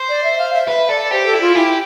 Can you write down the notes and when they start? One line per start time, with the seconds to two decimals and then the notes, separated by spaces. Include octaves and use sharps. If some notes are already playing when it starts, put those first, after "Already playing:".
Already playing: C5
0.09 D5
0.24 E5
0.38 F5
0.53 E5
0.68 B4 E5
0.89 A4 D5
1.11 G4 C5
1.26 A4
1.33 E4
1.41 F4
1.55 E4 G4